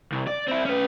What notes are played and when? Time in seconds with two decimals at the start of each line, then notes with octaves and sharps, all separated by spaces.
0.12 C2
0.27 D5
0.48 C4 E4
0.65 C#4 B4